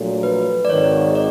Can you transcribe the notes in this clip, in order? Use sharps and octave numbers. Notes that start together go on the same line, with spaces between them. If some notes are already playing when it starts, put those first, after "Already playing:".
Already playing: A#1 A#2 F#3 A3
B4
D5
G#1 G#2 D#3 C#5
D5